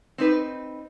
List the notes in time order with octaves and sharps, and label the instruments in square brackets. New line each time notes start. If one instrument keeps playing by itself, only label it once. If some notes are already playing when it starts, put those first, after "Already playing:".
[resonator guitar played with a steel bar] C4 D#4 B4